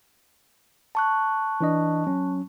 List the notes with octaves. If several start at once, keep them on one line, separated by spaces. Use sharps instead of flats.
A5 C#6 F#6
E3 D4 D#5
F#3 C#4